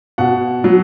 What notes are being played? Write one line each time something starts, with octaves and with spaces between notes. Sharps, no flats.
B2 F#5
F#3